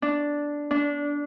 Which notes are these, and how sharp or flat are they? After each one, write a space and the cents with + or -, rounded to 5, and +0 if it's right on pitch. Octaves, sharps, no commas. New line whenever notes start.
D4 -5
D4 -20